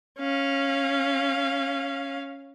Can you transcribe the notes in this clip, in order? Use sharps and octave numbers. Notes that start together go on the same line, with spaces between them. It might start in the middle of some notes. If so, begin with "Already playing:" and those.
C#4 F5